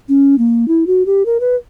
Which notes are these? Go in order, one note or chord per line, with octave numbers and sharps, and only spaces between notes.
C#4
A#3
E4
F#4
G4
A#4
B4